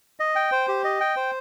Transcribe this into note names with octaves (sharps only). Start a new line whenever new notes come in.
D#5
G5
C5
G4
D#5
G5
C5